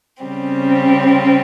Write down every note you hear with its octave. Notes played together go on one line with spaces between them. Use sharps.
C#3 G3 C4